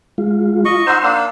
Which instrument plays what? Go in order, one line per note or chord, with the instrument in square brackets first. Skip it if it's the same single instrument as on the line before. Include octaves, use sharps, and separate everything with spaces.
[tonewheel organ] G#3 F4
[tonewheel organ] F4 [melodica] D#5 C#6
[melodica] D#4 C5 [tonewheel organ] F#5 C6 E6
[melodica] A#3 D4